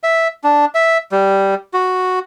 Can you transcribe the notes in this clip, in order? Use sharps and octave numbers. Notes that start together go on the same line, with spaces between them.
E5
D4
E5
G3
F#4